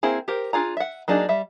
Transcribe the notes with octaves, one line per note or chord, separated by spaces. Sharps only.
A#3 C4 E4 G#4
G4 A#4 C5
D4 F4 G#4 A#5
E5 F#5
F#3 A#3 D4 D#4 G#4
G3 E5